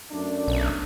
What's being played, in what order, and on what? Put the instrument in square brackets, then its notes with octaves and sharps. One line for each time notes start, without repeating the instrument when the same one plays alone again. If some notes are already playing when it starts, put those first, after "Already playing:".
[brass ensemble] F#2 A3 D4
[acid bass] B1